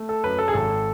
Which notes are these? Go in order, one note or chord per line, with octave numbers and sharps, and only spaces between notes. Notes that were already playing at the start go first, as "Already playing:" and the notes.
Already playing: A3
A4
F#2 B4
A4
G#4
G#1 A4